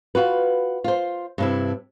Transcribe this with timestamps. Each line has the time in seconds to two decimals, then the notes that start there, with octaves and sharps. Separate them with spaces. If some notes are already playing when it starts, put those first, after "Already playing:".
0.15 F4 F#4 B4
0.84 F4 C5
1.38 G2 C3 E4